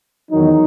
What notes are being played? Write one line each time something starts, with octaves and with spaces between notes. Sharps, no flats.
E2 D#3 F#3 D#4